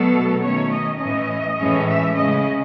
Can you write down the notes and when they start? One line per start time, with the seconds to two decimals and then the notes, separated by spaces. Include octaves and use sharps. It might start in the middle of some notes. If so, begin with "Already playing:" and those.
Already playing: B2 F#3 A3 A4
0.42 D#3 A3 C#4 C#5
0.71 D#5
0.99 A2 E3 A3 C#4 D#5
1.57 A2 E3 G#3 C#4
1.87 E5
2.15 C#3 G#3 C#4 D#5